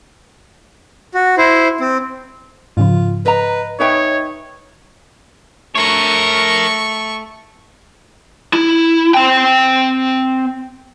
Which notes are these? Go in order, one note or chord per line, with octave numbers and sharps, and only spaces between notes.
F#4
E4 C5
C4
G#2 C#3 F3 F4
B4 D#5 A#5
D#4 B4 C#5 E5 G5
A3 A#4 C#5 C#6
E4
C4 G5